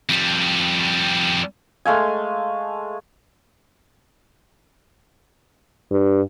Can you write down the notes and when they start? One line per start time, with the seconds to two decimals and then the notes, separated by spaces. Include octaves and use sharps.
0.09 F2 G3
1.85 G#3 A3 F5 G#5
5.91 G2